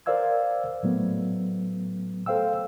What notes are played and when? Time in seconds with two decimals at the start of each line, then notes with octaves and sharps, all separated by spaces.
0.06 A#4 C5 D5 F5 E6 G#6
0.83 A2 F#3 A3 B3
2.26 A4 C5 F5 G5 E6